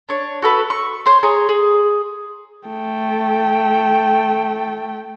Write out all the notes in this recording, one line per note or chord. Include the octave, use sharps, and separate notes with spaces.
D4 C#5
F#4 A4 B4
C#6
C5 C#5 C6
G#4 C#5 A#5 C6
G#4
A3 G5